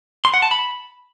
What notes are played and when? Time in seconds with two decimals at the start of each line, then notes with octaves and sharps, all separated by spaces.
0.25 C6
0.34 F#5
0.42 A5
0.51 B5